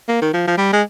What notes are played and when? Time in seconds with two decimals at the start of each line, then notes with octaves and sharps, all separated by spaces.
0.08 A#3
0.22 D#3
0.33 F3
0.47 F3
0.58 G3
0.73 G#3